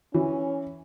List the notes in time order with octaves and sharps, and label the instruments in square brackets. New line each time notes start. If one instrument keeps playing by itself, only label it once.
[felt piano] E3 [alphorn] C#4